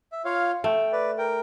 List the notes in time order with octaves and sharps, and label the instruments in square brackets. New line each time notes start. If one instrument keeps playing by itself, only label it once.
[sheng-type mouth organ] E5
F4 C#5 F5
[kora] A3 [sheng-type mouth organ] G5
[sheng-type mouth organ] B4 D5
A#4 G5